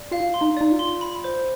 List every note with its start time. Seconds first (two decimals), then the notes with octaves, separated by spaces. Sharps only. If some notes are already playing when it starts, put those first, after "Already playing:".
Already playing: D5
0.11 F4 F5
0.34 C6
0.41 D#4
0.57 D#4 D5
0.72 F4
0.79 C6
1.01 B5
1.24 C5